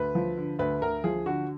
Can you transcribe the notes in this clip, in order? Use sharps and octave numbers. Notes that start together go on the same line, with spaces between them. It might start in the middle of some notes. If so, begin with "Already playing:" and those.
Already playing: D2 B4
F3
D3
D2 B4
D2 A#4
F3 G#4
D3 F#4